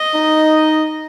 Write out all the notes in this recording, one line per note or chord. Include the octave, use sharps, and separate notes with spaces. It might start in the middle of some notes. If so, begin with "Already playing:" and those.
Already playing: D#5
D#4